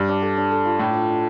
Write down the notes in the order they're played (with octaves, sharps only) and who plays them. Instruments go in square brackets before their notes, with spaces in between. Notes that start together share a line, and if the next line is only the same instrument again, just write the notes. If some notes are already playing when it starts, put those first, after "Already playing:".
Already playing: [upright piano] G2
[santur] D4
A4
D4
A4
F4
[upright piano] A2 [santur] A4
[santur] D4
D4